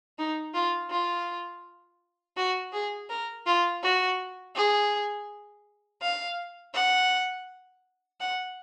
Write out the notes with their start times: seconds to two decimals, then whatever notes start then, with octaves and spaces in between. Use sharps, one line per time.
0.19 D#4
0.54 F4
0.91 F4
2.37 F#4
2.73 G#4
3.10 A#4
3.46 F4
3.83 F#4
4.55 G#4
6.02 F5
6.75 F#5
8.20 F#5